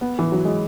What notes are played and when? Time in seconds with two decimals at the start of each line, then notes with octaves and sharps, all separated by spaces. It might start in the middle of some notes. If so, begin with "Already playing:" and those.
0.01 B3
0.19 E3
0.32 F#3
0.45 G#3